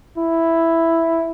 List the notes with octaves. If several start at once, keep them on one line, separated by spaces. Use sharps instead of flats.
E4